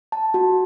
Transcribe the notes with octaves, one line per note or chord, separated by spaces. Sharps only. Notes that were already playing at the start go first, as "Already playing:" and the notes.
A5
F#4